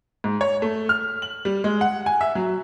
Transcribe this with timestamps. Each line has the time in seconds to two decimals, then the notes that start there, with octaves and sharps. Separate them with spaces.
0.24 G#2
0.41 C#5
0.62 A3
0.89 F6
1.22 F#7
1.45 G3
1.64 G#3
1.81 F#5
2.06 G#5
2.21 E5
2.35 F#3